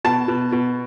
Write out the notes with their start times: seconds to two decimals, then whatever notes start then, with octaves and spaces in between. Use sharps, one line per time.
0.04 B2 A5
0.28 B2
0.52 B2